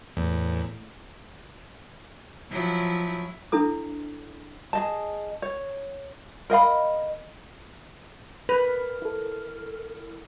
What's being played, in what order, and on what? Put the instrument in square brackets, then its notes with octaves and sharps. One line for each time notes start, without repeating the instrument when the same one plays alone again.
[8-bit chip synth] E2 [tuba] A2
[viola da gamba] F3 F#3 E4
[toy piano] D4 E4 A4 D#6
[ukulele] G#4 D#5 A5
C#5
A#4 D#5 F5 B5
[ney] A#4 [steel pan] B4
[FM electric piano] E4 A4